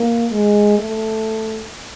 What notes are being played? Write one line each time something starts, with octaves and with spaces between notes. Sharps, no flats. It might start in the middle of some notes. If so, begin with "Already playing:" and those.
Already playing: A#3
G#3
A3